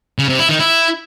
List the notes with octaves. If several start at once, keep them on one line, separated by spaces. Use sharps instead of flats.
C#3
C3
E4
D#3
E4